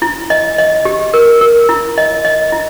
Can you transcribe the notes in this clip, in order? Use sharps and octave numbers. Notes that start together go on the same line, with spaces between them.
E4
D#5
D#5
G4
A#4
A#4
E4
D#5
D#5
E4